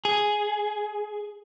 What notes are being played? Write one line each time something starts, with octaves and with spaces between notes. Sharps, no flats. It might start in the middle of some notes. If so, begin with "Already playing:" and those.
G#4